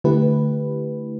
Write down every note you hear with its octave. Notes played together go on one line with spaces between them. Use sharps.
D3 A3 E4 G4 B4